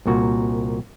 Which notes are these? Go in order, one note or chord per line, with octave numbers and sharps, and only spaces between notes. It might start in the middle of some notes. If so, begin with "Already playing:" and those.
C2 A#2 F#4